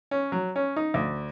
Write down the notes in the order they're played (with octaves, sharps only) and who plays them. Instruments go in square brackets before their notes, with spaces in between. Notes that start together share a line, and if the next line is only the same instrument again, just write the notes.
[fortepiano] C#4
F#3
C#4
D#4
D2